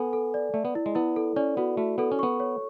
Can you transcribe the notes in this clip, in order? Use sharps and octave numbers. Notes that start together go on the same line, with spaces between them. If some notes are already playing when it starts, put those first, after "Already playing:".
Already playing: B3 A4 G#5
A4
D5
A3 D5
B3
E4
G#3
B3 E4
A4
C#4 D5
B3 F#4
A3 F#4
B3 A4
C#4
B3 C#6
C#5